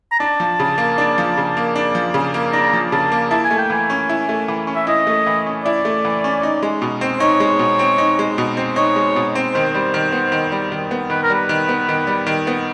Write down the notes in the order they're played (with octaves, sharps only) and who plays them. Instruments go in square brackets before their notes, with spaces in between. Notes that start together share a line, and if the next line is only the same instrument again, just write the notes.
[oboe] A#5
[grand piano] D4 [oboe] A5
[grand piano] F3
C#3
A#3
D4
F3
C#3
A#3
D4
F3
C#3
A#3
[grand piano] D4 [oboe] A#5
[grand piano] F3
[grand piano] C#3 [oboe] A5
[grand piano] A#3
[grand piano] E4 [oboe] A5
[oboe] G#5
[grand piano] A3
[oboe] G5
[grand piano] E3 [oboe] G#5
[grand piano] C#4
E4
A3
E3
C#4
[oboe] E5
[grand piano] E4 [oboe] D#5
[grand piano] A3
E3
C#4
[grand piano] E4 [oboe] D5
[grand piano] A3
E3
C#4
D#4
G#3
B2
C4
[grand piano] D#4 [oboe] C#5
[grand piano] G#3
B2
C4
D#4
G#3
B2
C4
[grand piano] D#4 [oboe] C#5
[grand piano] G#3
B2
C4
[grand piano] D#3 [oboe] C5
[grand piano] G3
D#3
B3
D#3
G3
D#3
B3
[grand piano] D#3 [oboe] B4
[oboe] A#4
[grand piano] G3 [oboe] B4
[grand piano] D#3
B3
D#3
G3
D#3
B3